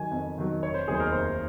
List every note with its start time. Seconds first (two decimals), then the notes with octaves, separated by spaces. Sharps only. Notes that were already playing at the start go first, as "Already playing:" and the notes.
Already playing: D#3 F#3 G#5
0.11 F2
0.38 D#3 F#3
0.63 F1 C#5
0.74 C5
0.88 D#2 D#3 F#3 G#4
0.95 C5
1.00 A#4
1.12 F1 C5